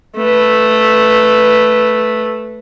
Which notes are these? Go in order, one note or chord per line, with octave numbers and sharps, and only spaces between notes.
A3 B4